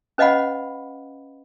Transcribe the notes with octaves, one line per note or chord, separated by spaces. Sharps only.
C#4 B4 D#5 F5 F#5 B5